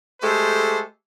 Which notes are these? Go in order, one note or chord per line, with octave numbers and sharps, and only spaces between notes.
G#3 A3 G4 A4 C5